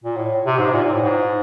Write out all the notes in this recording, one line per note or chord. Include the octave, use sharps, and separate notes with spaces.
A#2
A2
C3
G#2
A#2
A#2
A2
G#2